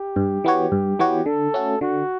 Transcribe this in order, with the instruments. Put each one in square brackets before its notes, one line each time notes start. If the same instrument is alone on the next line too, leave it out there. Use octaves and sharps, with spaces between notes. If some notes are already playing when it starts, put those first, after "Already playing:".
Already playing: [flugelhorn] G4
[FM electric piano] G2
E3 B3 F#4 C#5
G2
E3 B3 F#4 C#5
[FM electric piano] D3 [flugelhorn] A4
[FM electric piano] A3 C#4 F#4
[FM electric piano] D3 [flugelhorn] F#4